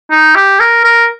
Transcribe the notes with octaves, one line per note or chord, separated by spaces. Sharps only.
D#4
G4
A#4
A#4